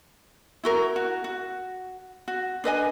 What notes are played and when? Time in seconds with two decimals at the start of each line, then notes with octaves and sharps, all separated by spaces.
0.64 E4 F#4 A#4
0.96 F#4
1.24 F#4
2.28 F#4
2.64 D4 B4 D#5 G#5